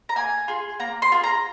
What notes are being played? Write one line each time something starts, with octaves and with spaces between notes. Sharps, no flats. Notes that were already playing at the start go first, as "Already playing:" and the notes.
A#5
A#3 G#5
F4 G#4
A#3 A#5
C6
F4 G#4
A#5